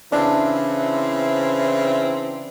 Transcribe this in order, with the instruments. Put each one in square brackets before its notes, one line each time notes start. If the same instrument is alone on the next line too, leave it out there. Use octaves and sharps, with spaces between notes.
[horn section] C#3 E3 C4 [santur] D4 [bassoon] E4